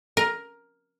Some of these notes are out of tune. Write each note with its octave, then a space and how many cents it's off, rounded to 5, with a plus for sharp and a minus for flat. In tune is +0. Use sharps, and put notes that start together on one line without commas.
A#4 +10